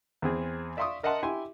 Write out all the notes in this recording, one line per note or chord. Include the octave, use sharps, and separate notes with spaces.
E2 C4 G#4
D5 E5 F5 C6 C#6 D#6
A#4 D#5 E5 F#5 A5 C6
E4 G4 G#5 C6